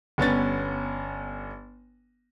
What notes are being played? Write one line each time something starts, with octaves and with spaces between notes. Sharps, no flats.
G1 B3 C#4 A6